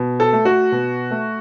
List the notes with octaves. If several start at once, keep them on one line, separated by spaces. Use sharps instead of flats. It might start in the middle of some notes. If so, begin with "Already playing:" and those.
Already playing: B2
A4
A3
F#4
B2
A3